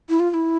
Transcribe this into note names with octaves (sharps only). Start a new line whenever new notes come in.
E4
F4
F4
E4